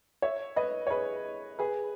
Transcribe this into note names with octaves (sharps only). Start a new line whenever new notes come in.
C#5 E5
B4 D#5
C#5
G#4 B4
G#4 B4